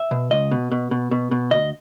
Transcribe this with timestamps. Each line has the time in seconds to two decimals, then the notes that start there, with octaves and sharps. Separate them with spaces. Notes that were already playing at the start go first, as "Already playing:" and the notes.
Already playing: E5
0.11 B2
0.31 C#2 D#5
0.51 B2
0.72 B2
0.91 B2
1.11 B2
1.31 B2
1.51 D2 D#5